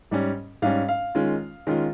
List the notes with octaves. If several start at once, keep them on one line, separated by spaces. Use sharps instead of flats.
G#2 G3 C#4
G#2 G3 C#4 F5
F5
D#3 G#3 C#4 F4
D#3 G#3 C#4 F4